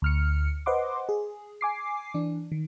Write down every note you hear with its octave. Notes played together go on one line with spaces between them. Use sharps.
D2 F6 C#7
B4 C5 D#5 F#5 C6 D6
G#4
G#5 D6 C7
E3 D4
D#3